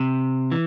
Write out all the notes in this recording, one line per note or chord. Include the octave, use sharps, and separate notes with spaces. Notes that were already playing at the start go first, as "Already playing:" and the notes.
Already playing: C3
E3